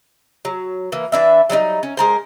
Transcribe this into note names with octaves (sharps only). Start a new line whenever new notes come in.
F#3
E3 A#3
E3 D4 E5
F#3 G3 C#4 D#4
C#4
G#3 A#4 C5